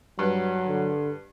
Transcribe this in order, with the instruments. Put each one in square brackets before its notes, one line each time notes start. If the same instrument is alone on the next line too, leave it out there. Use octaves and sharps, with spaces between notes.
[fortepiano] G2 B4 [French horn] F#3
[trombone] D3